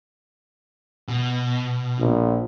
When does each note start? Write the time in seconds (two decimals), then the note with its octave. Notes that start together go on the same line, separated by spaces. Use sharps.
1.08 B2
1.99 A#1